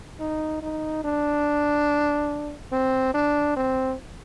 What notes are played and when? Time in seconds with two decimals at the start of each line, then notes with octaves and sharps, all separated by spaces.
0.20 D#4
0.63 D#4
1.05 D4
2.72 C4
3.14 D4
3.57 C4